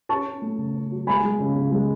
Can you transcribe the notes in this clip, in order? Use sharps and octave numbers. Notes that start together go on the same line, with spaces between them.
C#4 A5 C#6
C#4
A3
C#3
C#4
F#3
G#3 G#5 B5
G#3
C#3
C#3
G#3